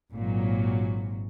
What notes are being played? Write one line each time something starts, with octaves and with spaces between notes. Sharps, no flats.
G#1 A#2 F#3